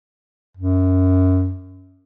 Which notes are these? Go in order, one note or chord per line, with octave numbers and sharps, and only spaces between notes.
F#2